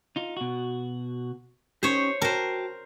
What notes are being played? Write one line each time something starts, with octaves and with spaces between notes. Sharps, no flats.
D#4 F4
B2 F#4
C#4 D#4 G4 C5 C#5
F#4 A#4 C5 G5 A5